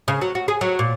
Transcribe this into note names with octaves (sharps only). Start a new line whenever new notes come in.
C#3
F#3
F#4
G#4
F#3
A#2